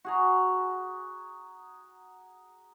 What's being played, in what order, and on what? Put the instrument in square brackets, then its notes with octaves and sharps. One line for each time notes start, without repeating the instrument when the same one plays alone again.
[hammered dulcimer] F#4 G#4 A#5